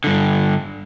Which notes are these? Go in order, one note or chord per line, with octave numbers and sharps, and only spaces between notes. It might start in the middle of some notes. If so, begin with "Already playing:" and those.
G2 D3